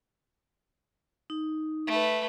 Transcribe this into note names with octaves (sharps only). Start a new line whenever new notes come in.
D#4
A3 B4